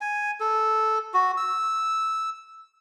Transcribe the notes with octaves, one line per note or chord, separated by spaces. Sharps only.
G#5
A4
F#4
E6